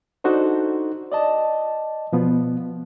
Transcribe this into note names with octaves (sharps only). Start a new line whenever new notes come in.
D4 D#4 F#4 A4 C5
D5 D#5 A5
B2 F3 B3